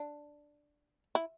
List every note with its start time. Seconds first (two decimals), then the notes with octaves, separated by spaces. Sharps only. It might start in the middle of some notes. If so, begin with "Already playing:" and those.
Already playing: D4
1.15 E4